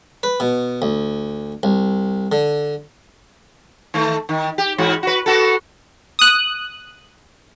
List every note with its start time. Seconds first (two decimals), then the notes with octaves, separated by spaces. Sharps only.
0.23 B4
0.40 B2
0.82 D2
1.63 C2
2.32 D3
3.94 D#3 A3
4.29 D#3
4.58 G4
4.78 E2 G#2 F#4
5.03 F#4 B4
5.26 B3 F#4 A4
6.19 D#6 F#6